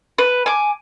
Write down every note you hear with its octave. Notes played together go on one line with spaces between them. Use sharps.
B4
G#5 D6